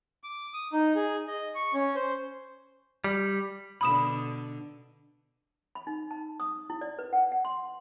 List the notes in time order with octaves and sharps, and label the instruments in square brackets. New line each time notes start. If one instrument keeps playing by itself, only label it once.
[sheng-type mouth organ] D6
D#6
D#4
G#4
D#5
C#6
C#4
C5
[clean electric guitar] G3
[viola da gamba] B2 D3 [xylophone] B5 D#6 E7
[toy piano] B5
D#4
A5
D#6
E4
D5
B4
F#5
F#5
C6